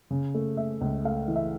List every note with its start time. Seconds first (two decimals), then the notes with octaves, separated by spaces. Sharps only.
0.11 C#3
0.34 A3
0.57 A3 E5
0.81 C#2
1.05 A3 F5
1.28 E3
1.36 E5